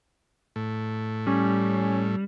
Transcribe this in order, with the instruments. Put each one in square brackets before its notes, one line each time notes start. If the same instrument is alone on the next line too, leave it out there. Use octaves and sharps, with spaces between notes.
[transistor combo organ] A2
[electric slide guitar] G3 [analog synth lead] C#4